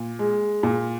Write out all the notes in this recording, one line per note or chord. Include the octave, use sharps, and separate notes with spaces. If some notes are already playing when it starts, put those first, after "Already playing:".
Already playing: A#2
G#3
A#2